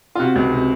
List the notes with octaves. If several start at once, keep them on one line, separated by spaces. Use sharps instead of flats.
F4
C3 F#4
C#2
C3